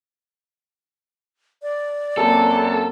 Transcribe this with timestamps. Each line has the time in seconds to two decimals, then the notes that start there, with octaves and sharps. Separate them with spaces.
1.62 D5
2.18 F#2 A#3 C4 A4